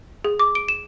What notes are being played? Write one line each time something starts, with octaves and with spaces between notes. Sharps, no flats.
G#4
D6
D7
E7